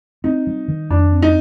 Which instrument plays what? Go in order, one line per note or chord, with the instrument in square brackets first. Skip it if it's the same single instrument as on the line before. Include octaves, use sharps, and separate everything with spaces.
[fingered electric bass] C4 [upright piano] D#4
[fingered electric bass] G3
D#3
[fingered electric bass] F2 [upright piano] D4
[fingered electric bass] C4
[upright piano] D#4